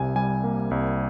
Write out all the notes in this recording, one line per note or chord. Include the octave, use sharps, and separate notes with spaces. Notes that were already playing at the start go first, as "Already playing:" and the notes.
Already playing: C2 C3 G#5
G3 G#5
A#3
C2